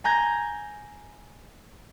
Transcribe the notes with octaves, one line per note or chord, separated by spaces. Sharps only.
G#5 A#5 G6 G#6 A#6